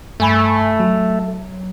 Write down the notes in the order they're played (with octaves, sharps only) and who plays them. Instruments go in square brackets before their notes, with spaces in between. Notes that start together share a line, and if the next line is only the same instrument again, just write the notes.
[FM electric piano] G2 G#5 B5 [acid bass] A3
[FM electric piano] F#3